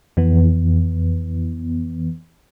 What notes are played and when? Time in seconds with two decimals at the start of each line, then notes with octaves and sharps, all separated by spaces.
0.17 F2 E3 B3